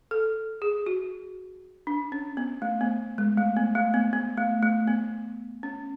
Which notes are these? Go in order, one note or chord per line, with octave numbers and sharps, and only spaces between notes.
A4
G#4
F#4
D4
C#4
B3
A3
B3
G#3
A3
B3
A3
B3
B3
A3
A3
B3
C#4